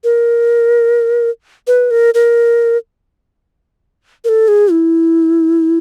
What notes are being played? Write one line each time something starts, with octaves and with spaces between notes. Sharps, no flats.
A#4
B4
A#4
A#4
A#4
A4
G#4
E4